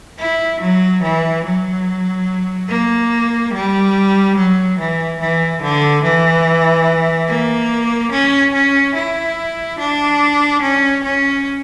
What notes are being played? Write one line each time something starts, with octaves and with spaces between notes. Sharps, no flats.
E4
F#3
E3
F#3
A#3
G3
F#3
E3
E3
D3
E3
A#3
C#4
C#4
E4
D4
C#4
C#4